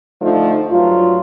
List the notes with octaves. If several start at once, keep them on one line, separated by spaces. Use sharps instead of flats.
D3 F3 A3 D#4
G2 F#3 F4